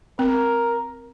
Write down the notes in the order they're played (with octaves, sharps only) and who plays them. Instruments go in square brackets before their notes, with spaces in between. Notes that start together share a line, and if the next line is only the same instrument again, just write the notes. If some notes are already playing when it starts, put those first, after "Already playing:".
[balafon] C4 [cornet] A#4